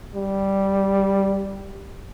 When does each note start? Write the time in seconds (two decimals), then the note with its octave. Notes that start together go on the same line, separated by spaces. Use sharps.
0.15 G3